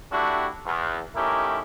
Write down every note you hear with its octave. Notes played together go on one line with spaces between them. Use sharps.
A3 D4 E4 F#4 G4
E2
A3 C#4 D#4 E4 G4 A#4